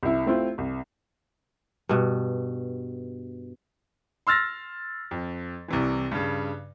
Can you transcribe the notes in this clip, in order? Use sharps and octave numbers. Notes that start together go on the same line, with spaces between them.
C2 E4
A3 C4 E4 F4
C2
G2 B2
C6 E6 F6 A6 A#6
F2
C2 C3 E3
G2 C#3